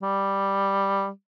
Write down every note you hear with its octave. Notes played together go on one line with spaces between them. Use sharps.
G3